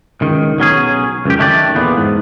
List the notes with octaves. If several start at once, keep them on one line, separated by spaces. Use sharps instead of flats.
C#2 D#3
B1 F#3 C#4 G#4
C#2 F#2 G4
D#3 A3 D4 E4 G4 D5
E2 A#2 B3
G#2